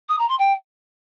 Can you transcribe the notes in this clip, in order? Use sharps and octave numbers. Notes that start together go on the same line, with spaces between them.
D#6
A#5
C6
G5